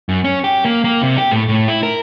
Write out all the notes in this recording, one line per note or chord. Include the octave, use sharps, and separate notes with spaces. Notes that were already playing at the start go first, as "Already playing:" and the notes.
F#2
C#4
G4
A#3
A#3
C3
G4
A2
A2
E4
A#4